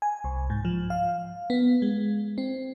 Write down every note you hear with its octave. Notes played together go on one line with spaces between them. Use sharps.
G#5
C2
G#2
F3
F5
B3
G#3
C4